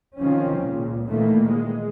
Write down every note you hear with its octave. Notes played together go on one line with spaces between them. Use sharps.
D#3 F3 C4 C#4
C#2 A#2
A#2 D#3 E3 A3 A#3
G#3